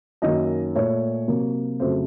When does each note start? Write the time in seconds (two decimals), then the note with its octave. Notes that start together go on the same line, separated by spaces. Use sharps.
0.22 F#2 D#3 A#3 D#5
0.75 A#2 A3 C#5
1.28 C3 F#3 A#3
1.80 F2 C#3 F#3 A3 C5